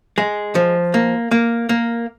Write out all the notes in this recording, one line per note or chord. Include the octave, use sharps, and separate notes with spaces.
G#3
F3
A#3
A#3
A#3